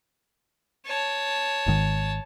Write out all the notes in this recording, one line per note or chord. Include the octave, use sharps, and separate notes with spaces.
C#5 A5
G#1 G#2 D#3